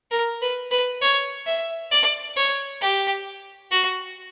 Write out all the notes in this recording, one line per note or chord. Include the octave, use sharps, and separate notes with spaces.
A#4
B4
B4
C#5
E5
D5
C#5
G4
F#4